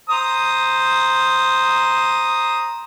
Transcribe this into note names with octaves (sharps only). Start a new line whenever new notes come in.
C5 A#5 D#6